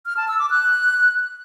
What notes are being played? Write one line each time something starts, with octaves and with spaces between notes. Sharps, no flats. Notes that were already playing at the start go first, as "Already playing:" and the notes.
F6
A5
E6
D6
F#6